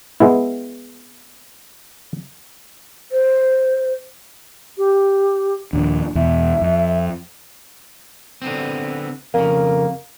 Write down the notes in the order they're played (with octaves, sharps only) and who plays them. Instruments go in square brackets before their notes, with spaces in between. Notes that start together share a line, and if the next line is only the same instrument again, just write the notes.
[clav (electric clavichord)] G#3 B3 E4
[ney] C5
[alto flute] G4
[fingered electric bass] D#2 A#2 F3 [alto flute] D4
[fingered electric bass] E2 B2 [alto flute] E5
[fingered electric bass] F2
[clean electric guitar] D3 B3 C4
[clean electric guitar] F2 C#3 [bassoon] A#3